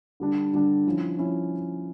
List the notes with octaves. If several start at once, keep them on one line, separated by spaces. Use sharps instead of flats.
D3 G3 D4
D3 G3 D4
F3 C#4 E4
F3 C#4 E4